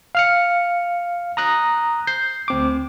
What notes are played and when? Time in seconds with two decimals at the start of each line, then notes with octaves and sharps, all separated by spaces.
0.15 F5 F6 C#7
1.37 A#5 D#6 F#6 A#6
2.07 G6 C7
2.48 D2 C4 D6